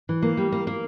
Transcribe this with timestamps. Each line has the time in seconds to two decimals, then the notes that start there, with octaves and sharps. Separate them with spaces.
0.09 E3
0.22 A#3
0.37 G3
0.52 A#3
0.67 A#3